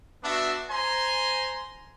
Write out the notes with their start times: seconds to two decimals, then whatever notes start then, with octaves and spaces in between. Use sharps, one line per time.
0.23 B3 D4 F#4 E5
0.70 C5 G#5 A#5 C6